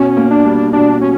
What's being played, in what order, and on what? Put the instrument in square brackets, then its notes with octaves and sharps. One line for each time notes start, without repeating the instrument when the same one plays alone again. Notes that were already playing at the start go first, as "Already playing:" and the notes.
Already playing: [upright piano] B2 [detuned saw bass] C#4
[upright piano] A#3
[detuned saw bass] D4
[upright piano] G3
[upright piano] B2 [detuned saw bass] D4
[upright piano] B2 [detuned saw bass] C#4